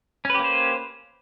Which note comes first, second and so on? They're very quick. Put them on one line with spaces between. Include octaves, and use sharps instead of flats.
C#4 B4 G4 A#3 C5